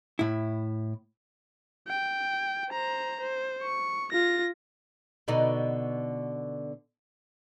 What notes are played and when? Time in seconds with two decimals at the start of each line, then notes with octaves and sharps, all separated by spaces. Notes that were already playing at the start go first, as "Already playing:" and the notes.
0.19 A2 E4
1.88 G5
2.71 C5 A#5
3.21 C5
3.63 C#6
4.13 F4 A#6
5.28 B2 D3 D#4